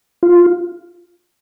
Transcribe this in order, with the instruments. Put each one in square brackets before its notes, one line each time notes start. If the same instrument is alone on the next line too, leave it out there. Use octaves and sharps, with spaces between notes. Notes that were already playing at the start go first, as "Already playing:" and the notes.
[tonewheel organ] F4